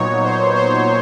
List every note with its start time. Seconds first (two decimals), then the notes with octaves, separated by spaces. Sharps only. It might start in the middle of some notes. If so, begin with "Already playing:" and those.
Already playing: A#2 F#3 B3 D#4 C#5
0.23 C5
0.55 C5